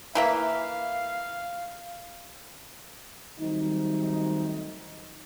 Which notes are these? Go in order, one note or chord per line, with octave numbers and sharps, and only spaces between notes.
E3 A#3 E5 F5
D#3 F#3 G3 A3 C4 D#4